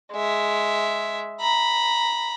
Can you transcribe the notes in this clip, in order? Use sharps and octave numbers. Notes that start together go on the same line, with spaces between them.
G#3 E5
A#5 B5